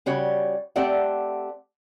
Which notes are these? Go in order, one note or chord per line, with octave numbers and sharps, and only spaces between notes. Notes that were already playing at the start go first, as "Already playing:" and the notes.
C#3 G3 F#4 C#5
A3 C4 G4 D5 E5 F#5